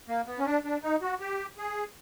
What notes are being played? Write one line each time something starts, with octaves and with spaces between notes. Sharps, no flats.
A#3
B3
C#4
D4
D4
D#4
F#4
G4
G#4